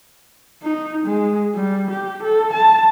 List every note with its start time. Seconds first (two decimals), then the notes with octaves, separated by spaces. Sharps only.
0.63 D#4
1.06 G#3
1.55 G3
1.91 G4
2.23 A4
2.53 A5